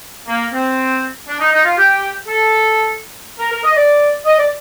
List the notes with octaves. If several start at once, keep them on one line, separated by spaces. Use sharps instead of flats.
A#3
C4
D4
D#4
D#4
F4
G4
A4
A#4
A#4
D#5
D5
D#5
D5